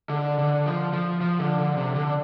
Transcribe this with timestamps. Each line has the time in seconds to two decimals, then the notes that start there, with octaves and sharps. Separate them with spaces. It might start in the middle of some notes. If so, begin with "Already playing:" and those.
0.09 D3
0.38 D3
0.66 F3
0.93 F3
1.21 F3
1.39 D3
1.58 D3
1.77 C3
1.95 D3